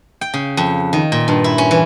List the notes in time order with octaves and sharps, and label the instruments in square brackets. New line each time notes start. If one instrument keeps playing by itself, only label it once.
[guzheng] G5
C#3
F2
D#3
A#2
G2
E4
C#4
E3